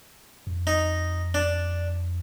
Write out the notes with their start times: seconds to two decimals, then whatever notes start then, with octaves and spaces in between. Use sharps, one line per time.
0.47 F2
0.67 D#4
1.34 D4